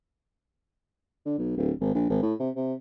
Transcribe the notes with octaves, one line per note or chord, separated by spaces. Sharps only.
D3
B1
D1
G#1
A#1
G#1
A2
C3
C3